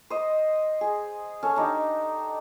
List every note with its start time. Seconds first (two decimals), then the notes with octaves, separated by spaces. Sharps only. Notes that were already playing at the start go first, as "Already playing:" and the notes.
0.10 C5 D#5
0.81 G#4
1.43 C#4 A4
1.56 D4 D#4 G4